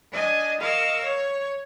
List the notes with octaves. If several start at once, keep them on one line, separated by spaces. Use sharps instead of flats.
D4 D#5 G#5 A5
A#4 D#5 F5 C#6 E6
C#5